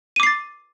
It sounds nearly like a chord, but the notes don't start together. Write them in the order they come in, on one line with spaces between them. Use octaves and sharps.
D#7 D6 C7 A6